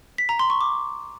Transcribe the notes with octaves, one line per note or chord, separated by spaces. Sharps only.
B6
A#5
C6
C#6
D6